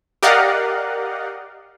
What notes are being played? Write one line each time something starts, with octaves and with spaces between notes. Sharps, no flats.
G4 A#4 D5 D#5 F5 F#5